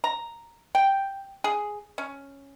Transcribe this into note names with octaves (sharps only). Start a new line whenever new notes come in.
A#5
G5
G#4
C#4